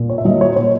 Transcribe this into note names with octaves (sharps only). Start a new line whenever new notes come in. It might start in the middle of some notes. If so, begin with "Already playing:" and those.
Already playing: A#2
C#5
E5
F#3 A#3 D#5
C#5
A#2 C#5